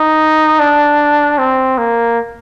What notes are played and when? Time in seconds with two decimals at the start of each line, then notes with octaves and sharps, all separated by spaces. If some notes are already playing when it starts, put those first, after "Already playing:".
Already playing: D#4
0.59 D4
1.38 C4
1.78 A#3